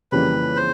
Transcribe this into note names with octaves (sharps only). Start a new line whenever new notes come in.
F2 C#3 E3 G3 A#3 B4
C5